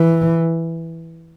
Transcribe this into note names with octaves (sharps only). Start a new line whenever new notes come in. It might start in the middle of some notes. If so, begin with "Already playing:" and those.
Already playing: E3